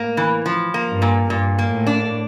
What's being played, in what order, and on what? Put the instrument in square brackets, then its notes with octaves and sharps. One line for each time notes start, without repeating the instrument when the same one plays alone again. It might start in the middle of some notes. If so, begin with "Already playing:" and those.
Already playing: [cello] A2 [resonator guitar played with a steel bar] A#3
[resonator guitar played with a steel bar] E3
F3
A#3
[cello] G2
[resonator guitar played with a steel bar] A#2
[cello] G2 [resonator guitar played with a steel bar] A#2
[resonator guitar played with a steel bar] A#3
[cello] A2
[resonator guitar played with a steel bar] D4